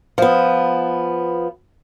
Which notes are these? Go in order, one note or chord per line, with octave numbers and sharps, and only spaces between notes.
F3 B3